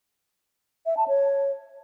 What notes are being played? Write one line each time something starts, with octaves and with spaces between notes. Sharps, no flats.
E5
A5
C#5